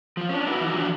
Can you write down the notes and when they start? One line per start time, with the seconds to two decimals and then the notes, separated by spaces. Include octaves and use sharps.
0.17 F3 F4
0.29 C#4 D4
0.46 D#4 E4 F#4 B4
0.61 E3 F3 C4 D#4 F#4
0.76 E3 F3 D4 F#4